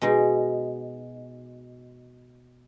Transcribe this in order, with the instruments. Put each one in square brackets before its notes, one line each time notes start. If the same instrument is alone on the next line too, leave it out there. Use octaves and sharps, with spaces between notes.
[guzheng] B2 G#3 D#4